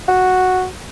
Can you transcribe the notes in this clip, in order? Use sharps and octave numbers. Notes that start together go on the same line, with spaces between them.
F#4